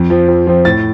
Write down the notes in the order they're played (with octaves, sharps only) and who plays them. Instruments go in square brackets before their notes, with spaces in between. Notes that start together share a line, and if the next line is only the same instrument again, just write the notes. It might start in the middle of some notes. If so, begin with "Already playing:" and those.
Already playing: [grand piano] F2
F3 C4
F2
F3 C4
A2 A6